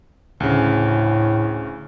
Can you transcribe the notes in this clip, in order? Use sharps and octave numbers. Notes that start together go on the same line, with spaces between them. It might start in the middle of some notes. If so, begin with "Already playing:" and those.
D2 A2 C#3